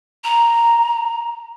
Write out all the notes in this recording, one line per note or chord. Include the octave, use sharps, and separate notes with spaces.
A#5